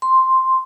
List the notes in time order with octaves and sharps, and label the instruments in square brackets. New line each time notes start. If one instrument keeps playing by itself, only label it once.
[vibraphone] C6